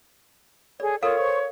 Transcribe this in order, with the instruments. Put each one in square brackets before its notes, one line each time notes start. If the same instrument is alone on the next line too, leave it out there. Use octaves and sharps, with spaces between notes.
[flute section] G#4 A4 C#5 [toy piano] D5
[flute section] F4 D#6 [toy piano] A4 A#4 F5 [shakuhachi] C#5
[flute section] C5 C#6